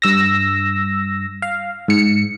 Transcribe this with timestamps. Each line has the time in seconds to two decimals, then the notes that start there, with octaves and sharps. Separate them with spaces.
0.02 G2 E6 A#6
1.42 F5
1.88 G#2 C#7